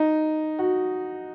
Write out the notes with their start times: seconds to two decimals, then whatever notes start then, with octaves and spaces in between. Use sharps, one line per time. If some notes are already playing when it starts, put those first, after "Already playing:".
Already playing: D#4
0.59 F#4